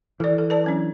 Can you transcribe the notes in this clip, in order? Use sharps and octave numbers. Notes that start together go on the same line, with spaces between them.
E3 A4 D5
A4
B4 D5 A5
F#3 C#4 D4